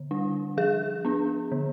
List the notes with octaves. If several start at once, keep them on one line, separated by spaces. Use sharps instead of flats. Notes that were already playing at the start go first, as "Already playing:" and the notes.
Already playing: D3
G3 D4
F3 G#4
B3 D4
D3